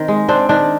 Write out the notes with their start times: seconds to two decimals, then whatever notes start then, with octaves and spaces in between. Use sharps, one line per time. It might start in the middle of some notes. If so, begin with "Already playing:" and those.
Already playing: D#3 C4
0.08 G#3
0.28 C4 D4
0.49 D#3 D4